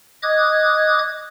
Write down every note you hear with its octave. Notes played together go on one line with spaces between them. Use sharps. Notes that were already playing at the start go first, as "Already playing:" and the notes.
D#5 D6 D#6 F#6 G#6